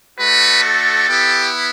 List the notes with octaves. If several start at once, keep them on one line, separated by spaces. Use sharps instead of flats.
A3 D4 F#4 B4
A4
B3 E4 G4